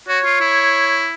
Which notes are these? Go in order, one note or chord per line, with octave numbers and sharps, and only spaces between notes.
F#4 C#5
F4
E4